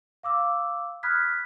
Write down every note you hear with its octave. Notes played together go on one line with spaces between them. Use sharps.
F5 D6 E6
B5 D#6 F6 F#6 G#6 B6